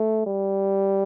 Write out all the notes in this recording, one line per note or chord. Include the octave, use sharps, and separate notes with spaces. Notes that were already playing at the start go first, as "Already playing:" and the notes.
Already playing: A3
G3